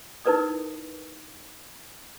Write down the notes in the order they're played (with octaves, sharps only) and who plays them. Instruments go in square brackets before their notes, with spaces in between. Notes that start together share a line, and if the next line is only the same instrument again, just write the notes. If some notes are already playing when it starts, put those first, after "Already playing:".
[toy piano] D#4 E4 A#4 B4 D5 D#6